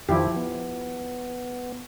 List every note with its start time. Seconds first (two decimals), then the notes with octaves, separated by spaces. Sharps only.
0.09 F2 D#3 F3 E4 G4
0.36 B3